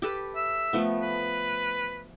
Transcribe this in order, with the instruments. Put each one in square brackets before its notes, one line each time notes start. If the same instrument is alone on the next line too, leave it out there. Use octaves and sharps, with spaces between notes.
[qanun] G4 A4 B4
[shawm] E5
[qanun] F3 A3 B3
[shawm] B4